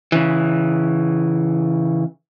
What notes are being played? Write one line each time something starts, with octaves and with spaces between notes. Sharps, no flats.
C#3 E3